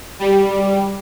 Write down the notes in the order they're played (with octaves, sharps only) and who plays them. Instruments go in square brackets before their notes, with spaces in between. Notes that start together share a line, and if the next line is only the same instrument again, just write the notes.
[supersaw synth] G3